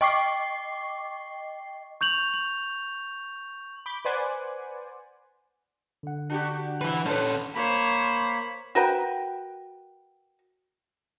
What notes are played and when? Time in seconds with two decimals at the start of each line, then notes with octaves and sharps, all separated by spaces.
0.01 D#5 G5 C#6 D6 C7
2.01 C#6 G6 F7 F#7
2.34 F#7
3.86 B5 D6 G6
4.05 B4 C5 D5 F#5 G#5
6.03 D3 F#5
6.30 D4 F#4 G4
6.81 A#2 E3 B4
7.06 C#4 D4 A4 B4 C#5 C6 G6
7.55 A#3 C5 C#5 B5
8.75 F#4 A#4 B4 G5